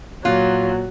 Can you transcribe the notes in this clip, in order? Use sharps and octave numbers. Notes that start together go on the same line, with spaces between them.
A#2 F#3 F4 F#6